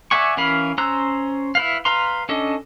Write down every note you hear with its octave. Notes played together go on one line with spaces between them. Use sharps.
D5 E5 F#5 G#5 C#6
E3 C#4 A#4 F5 B5
C#4 C5 A#5 E6 F#6
E4 B4 F5
B4 F5 A#5 C6
C#4 D4 A4 D#5